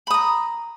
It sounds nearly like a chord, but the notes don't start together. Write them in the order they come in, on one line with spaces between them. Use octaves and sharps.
B5 D#6 A#5